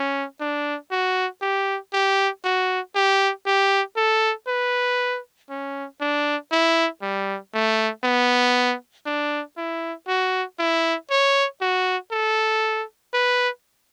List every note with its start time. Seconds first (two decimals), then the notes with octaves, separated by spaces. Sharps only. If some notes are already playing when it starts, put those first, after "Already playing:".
Already playing: C#4
0.41 D4
0.91 F#4
1.42 G4
1.93 G4
2.44 F#4
2.95 G4
3.46 G4
3.97 A4
4.48 B4
5.50 C#4
6.01 D4
6.52 E4
7.02 G3
7.54 A3
8.04 B3
9.06 D4
9.57 E4
10.08 F#4
10.59 E4
11.10 C#5
11.61 F#4
12.12 A4
13.14 B4